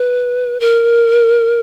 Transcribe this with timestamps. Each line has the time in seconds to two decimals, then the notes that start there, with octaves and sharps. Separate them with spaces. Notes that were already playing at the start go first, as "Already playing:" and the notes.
Already playing: B4
0.60 A#4